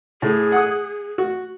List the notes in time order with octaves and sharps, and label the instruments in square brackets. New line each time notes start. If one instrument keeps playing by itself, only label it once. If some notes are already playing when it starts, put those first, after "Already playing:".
[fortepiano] A2 [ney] G#4
[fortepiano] F#5 D#6
F#4